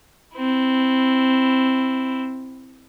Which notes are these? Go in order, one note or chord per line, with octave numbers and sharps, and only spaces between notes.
C4 E4